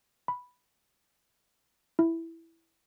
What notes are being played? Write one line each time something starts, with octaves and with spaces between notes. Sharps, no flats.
B5
E4